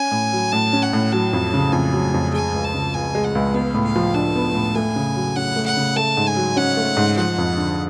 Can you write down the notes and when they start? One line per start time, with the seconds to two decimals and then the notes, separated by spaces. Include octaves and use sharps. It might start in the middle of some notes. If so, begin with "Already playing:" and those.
Already playing: C#4 G#5
0.11 A2
0.33 F#3
0.52 A2 A5
0.73 C#4
0.83 F#5
0.93 A2
1.12 F#3 A5
1.33 F2
1.54 C#3
1.73 F2 G#5
1.93 F#3
2.14 F2
2.34 G#3 G#5
2.54 C#2
2.64 A5
2.74 C#3
2.94 C#2 G#5
3.15 G#3
3.24 F#5
3.35 C#2
3.54 B3 F5
3.74 A2
3.85 F5
3.96 F3
4.15 D4 A5
4.35 B3
4.55 A2
4.75 A3 G#5
4.96 C#3
5.16 F#3
5.36 C#4 F#5
5.56 A3
5.66 F#5
5.77 C#3
5.96 A3 A5
6.17 G#2
6.27 G#5
6.36 F#3
6.56 C#4 F#5
6.77 A3
6.97 G#2
7.17 F3 F#5
7.38 F2
7.57 D3